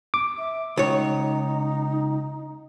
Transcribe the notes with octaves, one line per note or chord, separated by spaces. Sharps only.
D6
E5
C#2 D#4 C#5